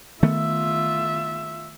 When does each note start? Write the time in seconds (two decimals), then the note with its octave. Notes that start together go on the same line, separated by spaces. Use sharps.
0.23 D#3 A3 B3 F4 E5